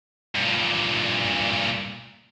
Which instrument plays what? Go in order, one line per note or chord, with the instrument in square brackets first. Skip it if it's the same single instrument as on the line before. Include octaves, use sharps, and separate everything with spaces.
[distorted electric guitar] G2 A#2